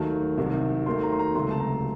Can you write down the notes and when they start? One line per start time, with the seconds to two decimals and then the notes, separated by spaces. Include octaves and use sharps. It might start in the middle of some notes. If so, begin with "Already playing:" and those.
Already playing: D#2 D#3 F#3 A3 A5
0.37 C2 C3 D#3 F#3
0.86 D#2 D#3 F#3 A3 C6
1.03 A#5
1.12 C6
1.19 A#5
1.35 C#2 C3 F#3 A3 C6
1.51 A5
1.60 A#5